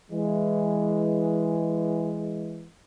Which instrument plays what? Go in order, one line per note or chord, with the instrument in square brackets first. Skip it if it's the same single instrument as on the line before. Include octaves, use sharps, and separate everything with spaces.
[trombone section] E3 G#3